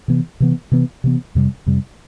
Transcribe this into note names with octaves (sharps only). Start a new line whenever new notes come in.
C3 E3 B3
C3 E3 B3
C3 E3 B3
C3 E3 B3
F2 C3 G3
F2 C3 G3